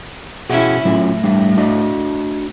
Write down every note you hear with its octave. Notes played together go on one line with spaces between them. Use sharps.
B2 C#4 E4 F#4 G#4
A2 F#3 C#4 F4
G3 D4 E5
D4 F#4 D#5